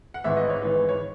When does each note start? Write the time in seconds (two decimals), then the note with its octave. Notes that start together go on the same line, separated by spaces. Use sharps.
0.14 F#5
0.24 G#1 G#2 E3 E5
0.37 D#5
0.49 C#5
0.62 G#1 G#2 E3
0.89 C#5